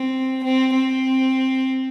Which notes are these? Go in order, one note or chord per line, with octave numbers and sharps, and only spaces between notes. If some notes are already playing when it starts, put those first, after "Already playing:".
Already playing: C4
C4
C4